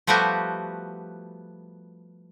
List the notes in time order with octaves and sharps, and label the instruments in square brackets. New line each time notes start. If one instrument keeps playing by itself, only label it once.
[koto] F3 G3 A3 B3 F#4 G4